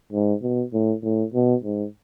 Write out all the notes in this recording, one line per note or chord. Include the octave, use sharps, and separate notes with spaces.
G#2
B2
A2
A2
B2
G#2